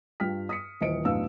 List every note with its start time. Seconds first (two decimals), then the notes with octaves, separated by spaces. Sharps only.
0.20 G2 F4 G5 F6 B6
0.49 D#6 B6 C#7
0.81 D#1 E3 C5 D#5 C#7 D7
1.05 B1 E2 A2 D4 F5 E6